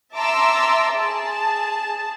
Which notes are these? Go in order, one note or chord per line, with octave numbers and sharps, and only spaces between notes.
E5 A5 A#5 C6 D6 E6
G#4 A5